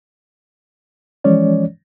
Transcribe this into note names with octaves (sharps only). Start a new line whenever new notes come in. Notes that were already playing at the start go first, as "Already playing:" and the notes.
E3 F3 G#3 C#4 C#5 D5